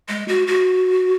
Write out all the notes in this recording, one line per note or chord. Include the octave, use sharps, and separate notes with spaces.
G#3
F#4
F#4